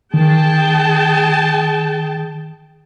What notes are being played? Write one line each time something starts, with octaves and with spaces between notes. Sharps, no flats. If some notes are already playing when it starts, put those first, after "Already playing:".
D#3 G#4 G5 A5